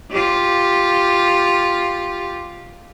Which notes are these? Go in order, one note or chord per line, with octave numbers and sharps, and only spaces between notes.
F4 G4